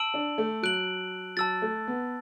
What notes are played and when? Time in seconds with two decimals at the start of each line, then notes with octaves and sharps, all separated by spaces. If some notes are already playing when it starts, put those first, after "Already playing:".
Already playing: A5 E6 D7 F#7
0.14 D4
0.38 A3
0.63 F#3 F#6 D7 F#7
1.37 F#3 A5 E6 A6
1.62 A3
1.88 B3